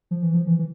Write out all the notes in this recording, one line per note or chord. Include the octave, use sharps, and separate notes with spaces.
F3
E3
F3
E3
E3